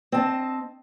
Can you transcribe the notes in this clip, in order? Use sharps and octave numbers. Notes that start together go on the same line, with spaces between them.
C4 D#5 A5